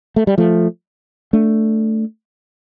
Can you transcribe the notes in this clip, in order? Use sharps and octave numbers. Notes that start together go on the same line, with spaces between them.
A3
G3
F3 A3
A3 D4